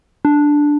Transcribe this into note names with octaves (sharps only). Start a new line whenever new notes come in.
D4